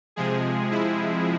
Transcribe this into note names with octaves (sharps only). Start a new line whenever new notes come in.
C3 F3 G#3 G#4
E4